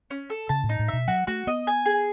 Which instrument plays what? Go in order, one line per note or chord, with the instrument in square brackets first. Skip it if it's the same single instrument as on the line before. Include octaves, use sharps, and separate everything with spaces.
[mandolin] C#4
A4
[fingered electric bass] C#3 [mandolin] A5
[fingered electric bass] A2
[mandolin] D#4
[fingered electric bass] A2
[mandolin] E5
[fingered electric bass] B2
[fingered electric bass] F#3 [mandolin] F#4
[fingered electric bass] A3 [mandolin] F#4
[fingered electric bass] B3 [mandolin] D#5
[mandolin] G#5
G#4